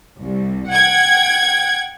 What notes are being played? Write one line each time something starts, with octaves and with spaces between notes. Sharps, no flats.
C2
F#5 G5 G#6